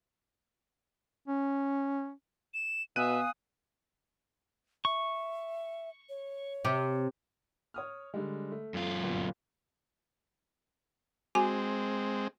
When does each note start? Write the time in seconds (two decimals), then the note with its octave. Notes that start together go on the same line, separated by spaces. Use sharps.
1.28 C#4
2.54 E7
2.96 B2 B3 E5 F5 G#5 D#6 F#6 D#7
4.85 E5 C#6
6.09 C#5
6.65 C3 G4
7.74 C#5 D#6 F6
8.14 D3 G3 G#3
8.51 A3
8.74 F#2 F4
9.03 G1 A#2
11.35 G#3 C4 F#4 G#5